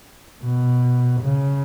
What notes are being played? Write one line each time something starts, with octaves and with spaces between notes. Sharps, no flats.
B2
C#3